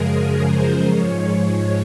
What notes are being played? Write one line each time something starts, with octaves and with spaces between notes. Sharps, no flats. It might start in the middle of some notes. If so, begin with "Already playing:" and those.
Already playing: F#2 C#3 F3 G#3 G#4 A#4
A#4
C5
G#2 F3 G#3 C#5